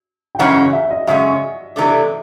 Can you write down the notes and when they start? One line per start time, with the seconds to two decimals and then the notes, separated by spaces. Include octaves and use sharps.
0.35 G5
0.39 F#2 C#3 E3 G#3 C#4 F#5
0.56 F5
0.73 E5
0.91 D#5
1.07 F#2 C#3 G#3 C#4 E5
1.76 C3 E3 A3 D4